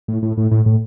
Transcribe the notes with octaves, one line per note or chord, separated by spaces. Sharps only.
A2
A2
A2
A2
A2